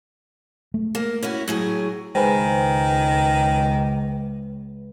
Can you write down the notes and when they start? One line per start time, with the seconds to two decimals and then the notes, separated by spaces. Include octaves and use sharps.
0.74 A3
0.95 A#3
1.22 C#4 E4 F#4
1.48 A2 F#3 G#4
2.15 C#2 D#3 G#3 B4 C5 G#5